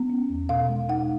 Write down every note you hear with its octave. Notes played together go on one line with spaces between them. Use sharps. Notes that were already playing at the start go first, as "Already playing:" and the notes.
Already playing: B3
C#4
E2
B2 F5
G#3
D#4 F#5